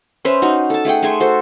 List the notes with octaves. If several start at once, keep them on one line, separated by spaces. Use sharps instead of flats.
C#4 B4 C5 E5
D#4 F#4
A4 A5
A3 G#4 F#5 G5
A3 G#4 G#5 C6
F#4 A4 C5